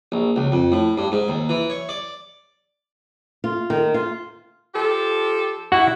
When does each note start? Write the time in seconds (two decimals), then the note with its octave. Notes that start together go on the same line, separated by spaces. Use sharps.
0.12 A#1
0.36 C#2
0.52 F2
0.72 A2
0.98 G2
1.12 G#2
1.29 D#2
1.49 E3
1.70 C#5
1.89 D5
3.44 F4
3.70 D#3
3.94 F4
4.73 F3 G4 A4
5.72 E4 F#4 F#5